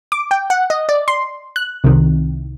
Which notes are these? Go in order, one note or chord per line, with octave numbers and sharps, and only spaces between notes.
D6
G5
F#5
D#5
D5
C6
F#6
C2 C3 D#3